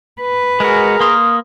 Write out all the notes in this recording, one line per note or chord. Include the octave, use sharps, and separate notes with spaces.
B4
G#3 F#4 G#4 A#4
A#3 C6 D#6 F6